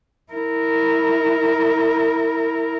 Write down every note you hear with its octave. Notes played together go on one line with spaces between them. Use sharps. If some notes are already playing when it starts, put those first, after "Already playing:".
E4 A#4